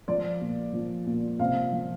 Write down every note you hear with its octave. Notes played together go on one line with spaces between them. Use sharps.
F3 D5
A#2
F3
A#2
C3 F5
F3